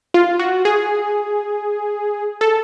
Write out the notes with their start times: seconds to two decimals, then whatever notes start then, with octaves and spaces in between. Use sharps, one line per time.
0.14 F4
0.39 F#4
0.65 G#4
2.41 A4